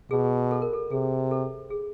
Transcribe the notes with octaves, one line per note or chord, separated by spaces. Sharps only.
B2 G#4
A4
A#4
A4
C3 G#4
A4
G#4